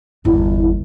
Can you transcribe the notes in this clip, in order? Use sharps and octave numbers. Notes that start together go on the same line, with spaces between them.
G1 E2 E4